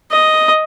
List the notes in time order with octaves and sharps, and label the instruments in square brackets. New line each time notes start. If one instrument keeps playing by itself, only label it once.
[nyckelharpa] D#5